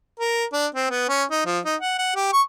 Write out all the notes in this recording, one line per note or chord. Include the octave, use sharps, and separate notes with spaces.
A#4
D4
C4
B3
C#4
D#4
F3
D#4
F#5
F#5
G4
C#6